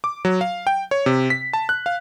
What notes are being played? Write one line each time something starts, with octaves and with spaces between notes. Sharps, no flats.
D6
F#3
F5
G5
C#5
C3
B6
A5
F#6
F5